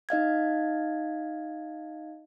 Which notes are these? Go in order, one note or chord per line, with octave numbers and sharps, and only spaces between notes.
D#4 D#5 F5 G#6